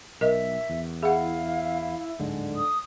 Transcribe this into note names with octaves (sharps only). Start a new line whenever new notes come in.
B1 A#4 D#5 E5
E2
E4 G#4 F5 F#5
D1 G#2 D3 G#3
D#6